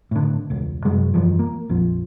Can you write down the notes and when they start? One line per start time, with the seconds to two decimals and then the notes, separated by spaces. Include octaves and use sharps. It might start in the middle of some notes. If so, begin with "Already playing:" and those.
0.11 A2 D3
0.50 E1 C#2
0.85 F#2 C3 F#3 G#3
1.14 E1 F#2 E3 F3
1.39 A#3
1.69 A#1 F2 F3